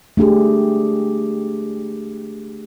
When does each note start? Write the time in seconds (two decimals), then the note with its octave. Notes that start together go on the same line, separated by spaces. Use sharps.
0.17 A3 D4 G4 G#4